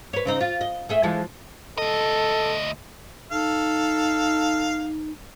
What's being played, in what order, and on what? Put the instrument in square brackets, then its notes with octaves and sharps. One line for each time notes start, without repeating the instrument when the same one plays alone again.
[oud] B4 C#5
C#3 C4 D#4
F4
D#5
A3 G#4 E5
E3 F3 G#3
[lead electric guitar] D2 D#5 [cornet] A4
[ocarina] D#4 [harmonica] A4 F5